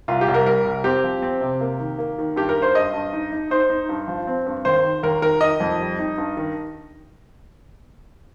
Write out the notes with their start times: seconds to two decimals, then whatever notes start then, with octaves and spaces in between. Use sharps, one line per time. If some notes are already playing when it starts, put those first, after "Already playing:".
0.08 C2 F4
0.21 G4
0.28 C2
0.34 A#4
0.46 G3 A#4
0.65 C2
0.84 C4 G4
1.04 F3
1.22 C4
1.41 C3
1.61 A#3
1.79 D#3
1.98 A#3
2.18 D#3
2.36 G2 G4
2.49 A#4
2.55 G2
2.62 C5
2.74 G2 D#5
2.93 G2
3.13 D#4
3.32 D#4
3.50 D#4 C5
3.70 D#4
3.89 G2
4.08 F3
4.27 C4
4.46 G2
4.65 D#2 C5
4.84 D#3
5.03 D#2 A#4
5.22 D#3 A#4
5.41 D#3 D#5
5.60 F2
5.79 G3
5.99 D#4
6.18 G2
6.37 D#3